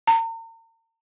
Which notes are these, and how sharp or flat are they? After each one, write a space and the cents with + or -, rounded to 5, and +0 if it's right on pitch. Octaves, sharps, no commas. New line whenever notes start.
A#5 -40